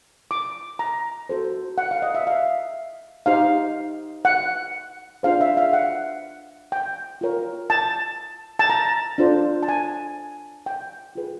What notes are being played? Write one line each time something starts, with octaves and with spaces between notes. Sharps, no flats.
D6
A#5
F#4 A4 C5
F#5
F5
D#5
E5
F5
D#4 G4 C5 F5
F#5
D4 F4 G#4 C5 F5
E5
F5
F#5
G5
F4 A#4 C#5
A5
A5
A#5
D4 F4 A4 C5
A5
G#5
G5
F4 G#4 B4